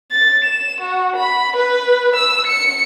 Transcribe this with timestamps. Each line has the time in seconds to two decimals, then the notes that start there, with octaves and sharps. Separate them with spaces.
0.11 A6
0.44 E7
0.81 F#4
1.16 B5
1.56 B4
2.16 E6
2.47 C#7